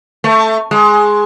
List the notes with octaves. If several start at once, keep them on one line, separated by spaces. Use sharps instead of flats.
A3
G#3